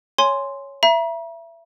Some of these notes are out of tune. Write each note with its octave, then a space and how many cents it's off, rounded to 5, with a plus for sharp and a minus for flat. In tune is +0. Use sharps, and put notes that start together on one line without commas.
C#5 +0 G#5 +0 C6 +0
E5 +25 A#5 +40